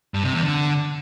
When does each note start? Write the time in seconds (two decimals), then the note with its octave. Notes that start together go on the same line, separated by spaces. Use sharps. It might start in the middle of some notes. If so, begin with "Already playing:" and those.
0.14 G2
0.24 C3
0.33 E2
0.43 D3